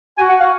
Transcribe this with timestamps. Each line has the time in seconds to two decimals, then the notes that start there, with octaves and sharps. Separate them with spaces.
0.18 F#4 G#5
0.29 F#5
0.40 F5